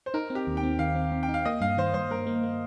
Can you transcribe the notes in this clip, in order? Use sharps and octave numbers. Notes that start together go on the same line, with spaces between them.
C5
D#4 A#4
C4
G4
D#2
G5
C4
D#3 F5
C4
C4
G5
D#4
F5
A#3 D#5
G2 F5
D#3 C5
G2 C5
G2 A#4
A#3
A#3